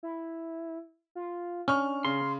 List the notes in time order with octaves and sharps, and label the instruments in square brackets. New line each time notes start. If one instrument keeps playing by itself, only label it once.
[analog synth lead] E4
F4
[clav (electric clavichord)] C#4 [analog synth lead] D4 [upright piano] C#6 F6
[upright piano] C#3 [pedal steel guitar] C6